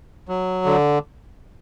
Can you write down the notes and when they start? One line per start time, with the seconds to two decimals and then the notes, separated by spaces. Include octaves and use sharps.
0.29 F#3
0.65 D3